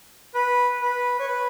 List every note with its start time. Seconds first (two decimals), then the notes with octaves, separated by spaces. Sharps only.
0.34 B4
0.82 B4
1.19 C#5
1.28 B4